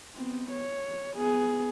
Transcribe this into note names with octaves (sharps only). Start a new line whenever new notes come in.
B3 C4
C#5
B3 G#4